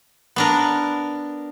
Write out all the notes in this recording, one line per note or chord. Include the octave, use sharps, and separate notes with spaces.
B3 D4 A#4